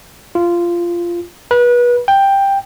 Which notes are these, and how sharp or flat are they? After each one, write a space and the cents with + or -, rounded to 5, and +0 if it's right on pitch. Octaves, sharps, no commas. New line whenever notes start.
F4 -15
B4 -30
G5 +10